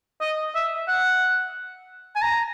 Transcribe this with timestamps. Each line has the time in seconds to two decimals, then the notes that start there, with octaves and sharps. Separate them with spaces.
0.21 D#5
0.55 E5
0.88 F#5
2.16 G#5
2.22 A#5